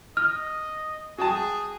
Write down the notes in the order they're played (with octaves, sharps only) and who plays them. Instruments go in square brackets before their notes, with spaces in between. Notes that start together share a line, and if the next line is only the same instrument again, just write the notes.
[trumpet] D#5 [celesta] F6
[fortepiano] F#4 G5 A5 [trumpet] G#4